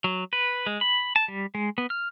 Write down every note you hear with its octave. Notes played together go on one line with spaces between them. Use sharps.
F#3
B4
G#3
B5
A5
G3
G#3
B3
F6